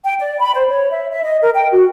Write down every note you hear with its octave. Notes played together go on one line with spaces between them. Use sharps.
G5
D5
B5
C5
C#5
E5
E5
D#5
A#4
G5
F#4